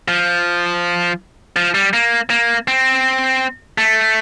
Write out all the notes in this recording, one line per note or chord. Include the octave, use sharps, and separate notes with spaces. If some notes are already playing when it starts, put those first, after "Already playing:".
F3
F3
G3
A#3
A#3
C4
A3